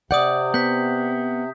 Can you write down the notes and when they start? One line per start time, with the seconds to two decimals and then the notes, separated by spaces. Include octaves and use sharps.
0.11 C3 D5 F#5 D#6 G6
0.54 B3 G6 B6